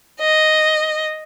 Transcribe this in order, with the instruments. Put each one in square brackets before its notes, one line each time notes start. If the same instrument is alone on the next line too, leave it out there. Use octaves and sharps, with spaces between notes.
[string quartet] D#5